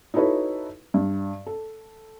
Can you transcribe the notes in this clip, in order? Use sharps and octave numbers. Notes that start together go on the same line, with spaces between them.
D#4 E4 F#4 A4 B4 C#5
G2
A4